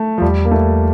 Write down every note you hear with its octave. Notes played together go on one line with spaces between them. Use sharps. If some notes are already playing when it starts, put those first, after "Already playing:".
Already playing: A3
F3
E2 G3
A#3
A3